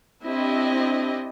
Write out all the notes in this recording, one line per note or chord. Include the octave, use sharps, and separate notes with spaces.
C4 D4 E4 G4 D#5